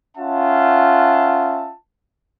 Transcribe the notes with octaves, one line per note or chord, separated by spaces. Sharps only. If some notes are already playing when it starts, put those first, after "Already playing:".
C#4 F4 E5 F#5 A5